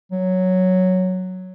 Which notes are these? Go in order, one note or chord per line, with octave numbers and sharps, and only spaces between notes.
F#3